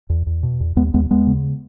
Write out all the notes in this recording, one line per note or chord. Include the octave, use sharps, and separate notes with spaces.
E2
E2
B2
E2
D#2 G#3 B3
D#2 G#3 B3
D#2 G#3 B3
C#3